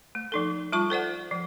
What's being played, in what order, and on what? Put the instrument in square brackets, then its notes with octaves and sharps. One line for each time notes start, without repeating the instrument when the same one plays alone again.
[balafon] A3
F3 D#4 A4
G3 F4 A5 C#6
A4 C5 D5 F#5
F3